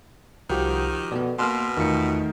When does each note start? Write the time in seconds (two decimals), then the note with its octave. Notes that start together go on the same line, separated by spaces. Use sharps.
0.50 C2 D#3 F3 F#4 G4 G6
1.11 B2 B3 A4 D5
1.39 B2 A#3 B3 C6 F6
1.77 E2 D#3 A3 D#4 F4 C#7